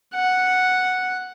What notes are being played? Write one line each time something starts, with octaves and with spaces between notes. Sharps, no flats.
F#5